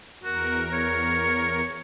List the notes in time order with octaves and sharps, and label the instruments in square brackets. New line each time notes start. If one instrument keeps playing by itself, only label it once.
[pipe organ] E2 A#4 [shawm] F#4
[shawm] C#5